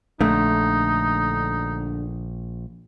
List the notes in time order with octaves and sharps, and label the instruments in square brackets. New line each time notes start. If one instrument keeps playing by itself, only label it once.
[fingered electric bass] A#1 [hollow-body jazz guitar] D3 A3 [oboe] D#4